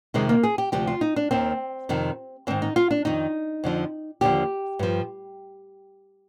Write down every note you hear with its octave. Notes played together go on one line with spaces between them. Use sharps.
F2 C3 D#3 G#3
A#3
G#4
G4
D2 C3 F3 G4
F4
D#4
D4
D#2 D#3 C4
F2 C3 D#3
G#2 D#3 C4
D#4
F4
D4
F2 D#3 D#4
F2 D3 F3
D#2 D3 F3 G4
G2 F3